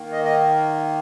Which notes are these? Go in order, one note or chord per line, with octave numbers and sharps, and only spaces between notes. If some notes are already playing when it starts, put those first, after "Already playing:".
Already playing: D#3 A#3
D#5
D#5